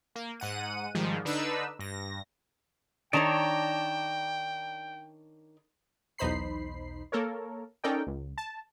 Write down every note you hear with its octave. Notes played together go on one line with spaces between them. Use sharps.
A#3
G#2 F#5 D#7
G#2 D#3 F3 G3 G#3
D3 D4 D#4 B4 E6
G2 A#6
D#3 D4 C#5 D5 G5 A5 A#5
B1 E2 D#4 C5 B5 C7
A#3 A4 A#4 C#5
C#4 D#4 A4 A#4 D5 G5
C#2
A5